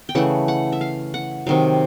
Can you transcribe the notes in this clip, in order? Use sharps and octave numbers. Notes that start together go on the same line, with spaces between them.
G5
C#3 E3 A3 F#5
F#5
E5
F5
F#5
C3 D#3 F#3 F5